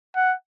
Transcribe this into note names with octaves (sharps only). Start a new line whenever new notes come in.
F#5